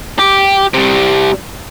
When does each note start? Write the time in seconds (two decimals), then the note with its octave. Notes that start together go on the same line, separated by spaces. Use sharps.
0.19 G4
0.74 C3 G3